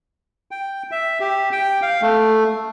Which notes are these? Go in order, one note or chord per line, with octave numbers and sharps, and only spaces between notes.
G5
E5
G4
G5
F5
A3